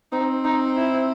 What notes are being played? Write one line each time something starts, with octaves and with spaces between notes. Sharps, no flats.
C4 D#4
D#4
E4